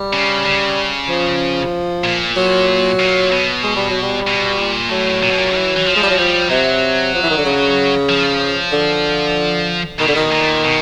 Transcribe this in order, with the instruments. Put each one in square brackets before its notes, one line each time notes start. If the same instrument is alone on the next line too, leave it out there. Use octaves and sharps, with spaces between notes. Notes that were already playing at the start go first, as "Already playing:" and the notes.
Already playing: [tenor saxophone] G3
[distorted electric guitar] C#3
C#3
[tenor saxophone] F3
[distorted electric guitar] A#2
[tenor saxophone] F#3
[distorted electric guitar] A#2
B2
[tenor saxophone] G#3
G3
F#3
G3
[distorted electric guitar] B2
A#2
[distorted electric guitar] A2 [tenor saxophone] F#3
[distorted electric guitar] A#2
B2
A#2
E3
E3
F3
[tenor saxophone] G#3
G3
F#3
[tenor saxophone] F3 [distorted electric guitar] G3
[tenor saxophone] C3 [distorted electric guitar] F#3
[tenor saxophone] F3
E3
D#3
D3
C#3
[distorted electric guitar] F3
[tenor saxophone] D3
[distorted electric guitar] B2 [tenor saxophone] D#3
[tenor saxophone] D3
D#3
[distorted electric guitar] A#2
B2